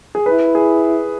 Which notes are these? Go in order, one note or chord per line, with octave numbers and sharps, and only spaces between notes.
G#4
E4 B4
G#4